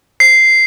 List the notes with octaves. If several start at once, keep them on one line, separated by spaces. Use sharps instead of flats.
C7